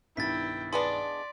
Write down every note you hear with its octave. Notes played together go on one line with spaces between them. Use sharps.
B1 G2 D#3 E4 G5 A6 B6
G#3 B3 D4 D5 C6